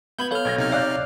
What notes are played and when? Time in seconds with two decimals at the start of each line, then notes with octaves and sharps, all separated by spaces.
0.19 B3 B5 G6 G#6 F#7
0.31 A4 C#5 F5 F6 G6
0.45 B1 G#6 A#6
0.58 C3 D#4 F6
0.72 C#5 D5 F5 F#6 G6